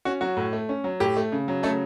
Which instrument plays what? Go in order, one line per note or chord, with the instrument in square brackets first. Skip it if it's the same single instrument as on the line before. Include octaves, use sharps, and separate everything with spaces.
[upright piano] C#4 F#4
F#3 F#4
A2
A3
C#4
F#3
A2 G4
A3
C#3
F#3
C#3 A3 A4